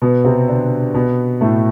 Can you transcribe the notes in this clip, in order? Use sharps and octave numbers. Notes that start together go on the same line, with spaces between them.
B2 B3
C3 C4
D3 D4
B2 B3
A2 A3